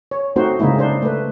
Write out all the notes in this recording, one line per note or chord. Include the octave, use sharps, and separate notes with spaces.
C#5
A3 C4 D#4 F#4 C5
C#3 G#3 A#3 D#4 E4
D4 D#4 C5
A3 B4